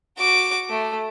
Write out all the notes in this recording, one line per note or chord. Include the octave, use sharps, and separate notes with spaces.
F#4 D6
A3